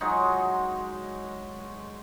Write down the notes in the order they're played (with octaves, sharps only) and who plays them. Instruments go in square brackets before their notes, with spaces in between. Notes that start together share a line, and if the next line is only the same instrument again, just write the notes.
[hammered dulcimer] F#3 G#3 D#4